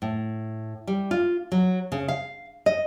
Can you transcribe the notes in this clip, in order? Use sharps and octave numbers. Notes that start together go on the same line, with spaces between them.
A2
G3
F4
F#3
C#3
F5
D#5